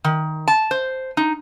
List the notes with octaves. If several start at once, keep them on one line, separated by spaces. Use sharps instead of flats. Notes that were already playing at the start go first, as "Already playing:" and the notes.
D#3
A5
C5
D#4